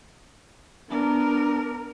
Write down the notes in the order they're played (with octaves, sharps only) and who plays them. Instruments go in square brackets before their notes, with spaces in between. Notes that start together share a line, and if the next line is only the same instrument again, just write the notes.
[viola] B3 [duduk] D4 [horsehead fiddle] A#4